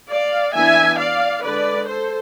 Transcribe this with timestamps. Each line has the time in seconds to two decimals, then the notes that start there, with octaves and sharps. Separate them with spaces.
0.10 D5 F5
0.54 E3 B3 D4 E5 G#5
0.98 D5 F5
1.43 D3 G#3 D4 B4 D5
1.87 A4 C5